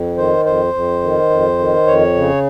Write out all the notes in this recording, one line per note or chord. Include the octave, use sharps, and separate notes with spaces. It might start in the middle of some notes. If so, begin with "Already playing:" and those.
Already playing: F2
D#3 C5
F2 C5
F2
D#3
F2
D#3
F2 C#5
C#3